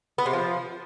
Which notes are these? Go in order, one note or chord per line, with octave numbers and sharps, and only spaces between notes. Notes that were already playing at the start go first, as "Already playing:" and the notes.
B3
C3
F3